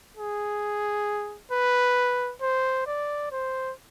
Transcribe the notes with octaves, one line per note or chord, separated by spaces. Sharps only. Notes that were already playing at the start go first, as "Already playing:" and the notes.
G#4
B4
C5
D5
C5